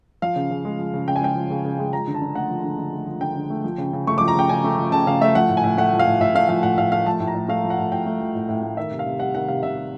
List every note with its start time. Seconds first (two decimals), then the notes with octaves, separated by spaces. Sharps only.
0.22 F3 F5
0.36 C#3
0.50 C#3
0.65 G#3
0.78 F3
0.94 C#3
1.07 C#3 G5
1.16 G#5
1.21 G#3 G5
1.36 F3
1.50 C#3
1.65 C#3
1.79 G#3
1.93 F3 A#5
2.07 D3
2.14 A5
2.22 D3
2.35 A3 F#5
2.50 F3
2.64 D3
2.79 D3
2.93 A3
3.07 F3
3.21 D3 G5
3.36 D3
3.50 A3
3.64 F3
3.78 C#3
3.93 C#3
4.07 A3 C#6
4.18 D6
4.21 F3
4.28 A#5
4.35 C#3 G5
4.49 C#3 G#5
4.64 A3
4.78 F3
4.92 C#3 A5
5.06 C#3 F5
5.21 A3 E5
5.35 F3 F#5
5.49 A2
5.57 G#5
5.64 A2
5.78 A3 F#5
5.93 F3
5.99 F5
6.06 A2
6.20 A2 E5
6.35 A3 F5
6.49 F3 F5
6.63 A2 F#5
6.78 A2 F5
6.92 A3 F5
7.06 F3 A5
7.20 A2
7.27 A#5
7.35 A2
7.49 A3 F5
7.64 F3
7.70 F#5
7.78 A2
7.92 A2 G5
8.06 A3
8.20 F3
8.35 A2
8.48 A2
8.63 A3
8.77 D#3 E5
8.91 C3
8.99 F5
9.06 C3
9.20 G3 F#5
9.35 D#3 F#5
9.48 C3 F5
9.63 C3 E5
9.77 G3